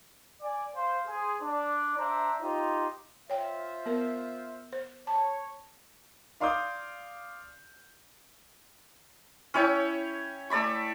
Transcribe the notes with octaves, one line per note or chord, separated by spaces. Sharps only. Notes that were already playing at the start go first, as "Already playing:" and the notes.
D5 G#5
C5 F5
G#4 C5
D4 D5
D4 C5 E5 A#5
D#4 F4 G4 C5
F4 C5 C#5 E5 G5
B3 A#4
C5
C#5 A5
D5 F5 C6 D6 D#6 G6
C#4 E4 C#5 G5
A3 D5 B5 C#6